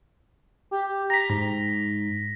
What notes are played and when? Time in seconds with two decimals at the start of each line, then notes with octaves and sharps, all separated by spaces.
0.71 G4
1.10 A#5 A#6 B6
1.30 G#2